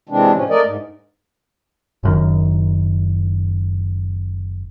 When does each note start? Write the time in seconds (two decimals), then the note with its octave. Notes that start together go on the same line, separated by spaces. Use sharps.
0.09 C3 E3 G#3 C4 D4
0.34 A2 F3 C#4
0.50 A3 A#4 D5 D#5
0.64 G#2
2.03 F#1 F#2 D#3